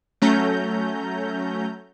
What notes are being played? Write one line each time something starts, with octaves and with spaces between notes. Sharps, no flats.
F#3 A3 C#4 A#5 G6